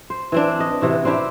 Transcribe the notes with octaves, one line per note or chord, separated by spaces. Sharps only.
C5
E3 C4 D4
D#5
C3 E3 F#4
C4 D4 E4 G4